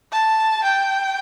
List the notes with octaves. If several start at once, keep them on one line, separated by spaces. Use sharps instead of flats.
A5
G5